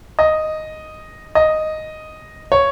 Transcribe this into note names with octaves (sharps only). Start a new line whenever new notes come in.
D#5
D#5
C#5